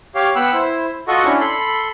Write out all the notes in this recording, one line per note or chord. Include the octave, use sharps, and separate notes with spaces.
G4 C#5 F5
B3 F#5 G5 B5 E6
E4 C5
F4 F#4 A4 D#5 F#5 C#6
C#4 D4 E4
A4 B5 C6